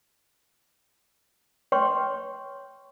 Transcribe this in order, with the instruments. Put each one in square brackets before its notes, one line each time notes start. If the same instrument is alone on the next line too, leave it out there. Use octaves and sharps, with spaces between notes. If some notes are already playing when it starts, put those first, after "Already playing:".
[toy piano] B4 C#5 G5 C6 C#6